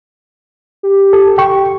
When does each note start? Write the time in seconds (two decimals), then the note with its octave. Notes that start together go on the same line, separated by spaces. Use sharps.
0.83 G4
1.13 A4
1.38 G5 C#6